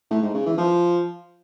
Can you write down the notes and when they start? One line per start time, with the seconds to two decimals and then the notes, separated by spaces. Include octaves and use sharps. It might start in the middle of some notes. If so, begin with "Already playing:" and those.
0.11 A2
0.22 G#2
0.34 C#3
0.46 E3
0.58 F3